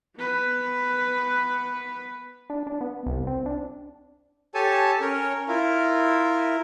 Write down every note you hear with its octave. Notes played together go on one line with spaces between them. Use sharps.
B3 B4
D4
D4
B3
C2
C4
D4
G4 A4 C#5 G#5 A5
C#4 A#4 C#5
E4 F4 A#4